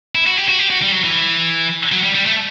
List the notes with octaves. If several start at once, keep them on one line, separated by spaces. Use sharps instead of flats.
E4
F#4
G4
F#4
G4
F#4
G3
F#3
E3
F#3
G3
G3
A3